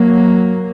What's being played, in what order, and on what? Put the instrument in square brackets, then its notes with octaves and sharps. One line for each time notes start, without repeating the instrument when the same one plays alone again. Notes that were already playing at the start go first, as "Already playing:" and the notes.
Already playing: [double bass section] F#3 A#3